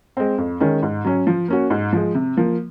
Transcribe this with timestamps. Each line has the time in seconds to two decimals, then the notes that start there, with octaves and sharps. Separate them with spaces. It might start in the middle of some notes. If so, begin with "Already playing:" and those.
0.17 G#3 C4
0.38 F2
0.60 D#3 G#3 C#4
0.82 G#2
1.04 F#3 C#4
1.27 F3
1.48 A#3 C#4 F#4
1.70 G#2
1.93 F3 G#3
2.15 C3
2.37 F3 A#3